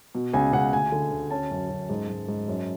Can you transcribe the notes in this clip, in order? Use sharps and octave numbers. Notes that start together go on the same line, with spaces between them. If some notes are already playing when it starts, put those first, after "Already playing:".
B2
C#2 G#5
C#2 F#5
D2 G#5
D3
D2
C#4 A5
F#2
F#2
G#2
G#2
G#2
F#2